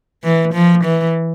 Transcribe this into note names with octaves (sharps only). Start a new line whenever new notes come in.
E3
F3
E3